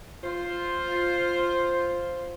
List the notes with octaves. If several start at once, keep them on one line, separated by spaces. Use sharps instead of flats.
F4 C5